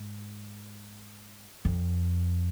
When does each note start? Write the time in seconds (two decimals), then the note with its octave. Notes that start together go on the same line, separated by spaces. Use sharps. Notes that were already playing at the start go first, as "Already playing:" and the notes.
Already playing: G#2
1.65 F2